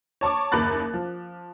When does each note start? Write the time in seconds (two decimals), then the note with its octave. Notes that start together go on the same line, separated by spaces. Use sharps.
0.21 C#5 A5 C#6 D6
0.52 F#1 D#2 A#4 B5 F#6 A6
0.94 F3